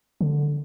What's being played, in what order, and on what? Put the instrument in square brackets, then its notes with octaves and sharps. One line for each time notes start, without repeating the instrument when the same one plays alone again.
[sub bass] D3